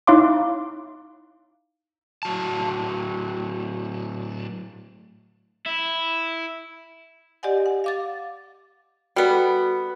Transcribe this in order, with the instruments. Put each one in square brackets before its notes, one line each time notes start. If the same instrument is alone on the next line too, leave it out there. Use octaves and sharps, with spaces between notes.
[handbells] D#4 E4 C#5 F5 C6 D6
[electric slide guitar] A2 F#3 A5
[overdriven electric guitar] E4
[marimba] G4 D5 D#5 F#5 G#5
F#5
F5 D6 A6
[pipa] G3 B3 [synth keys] F#4 A4